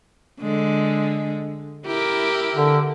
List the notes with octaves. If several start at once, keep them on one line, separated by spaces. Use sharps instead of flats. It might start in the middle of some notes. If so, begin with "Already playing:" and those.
D3 G#3
E4 G4 A#4
D3